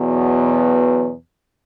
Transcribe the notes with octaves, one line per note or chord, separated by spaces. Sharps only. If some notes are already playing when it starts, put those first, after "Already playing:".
Already playing: E2 B2 F#3 B3